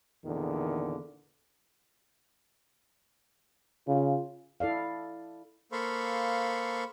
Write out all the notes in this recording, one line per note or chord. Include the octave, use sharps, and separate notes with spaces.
E2 A#2 D3 D#3
C#3 F4
E4 A4 D5 F5
A#3 A4 C5 F5 B5 C#6